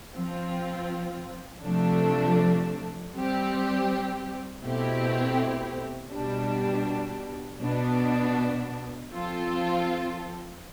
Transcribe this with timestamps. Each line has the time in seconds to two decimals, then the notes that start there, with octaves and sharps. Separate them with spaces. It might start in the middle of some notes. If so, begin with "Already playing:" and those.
0.15 F3 C4 F4
1.64 C3 F3 A3 D4
3.14 G3 C4 G4
4.63 B2 A3 C4 E4 G4
6.13 B2 G3 D4
7.62 B2 B3 D4
9.12 F3 C4 F4 A4